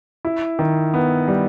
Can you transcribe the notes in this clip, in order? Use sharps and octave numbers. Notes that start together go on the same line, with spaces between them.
E4
D#3
B3
G3